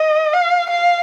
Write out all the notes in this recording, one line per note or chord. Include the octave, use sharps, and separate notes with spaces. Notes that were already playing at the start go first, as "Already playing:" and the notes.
Already playing: D#5
F5
F5